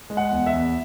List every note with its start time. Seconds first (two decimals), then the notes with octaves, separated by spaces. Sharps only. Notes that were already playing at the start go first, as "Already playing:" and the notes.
0.10 G#3
0.17 F#5
0.31 E2
0.46 E5
0.53 E2